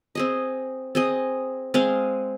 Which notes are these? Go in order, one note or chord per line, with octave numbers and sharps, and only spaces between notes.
C4 G#4 D#5
C4 G#4 D#5
G#3 C4 G#4 F5